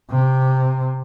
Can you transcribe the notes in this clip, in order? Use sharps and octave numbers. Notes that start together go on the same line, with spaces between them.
C3